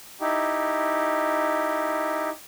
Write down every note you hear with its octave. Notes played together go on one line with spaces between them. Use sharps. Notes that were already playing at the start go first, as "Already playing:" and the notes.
D#4 E4 G4